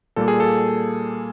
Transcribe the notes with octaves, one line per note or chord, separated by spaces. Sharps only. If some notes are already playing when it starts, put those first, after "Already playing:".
A#2 G3 A#3 A4
G#4
A4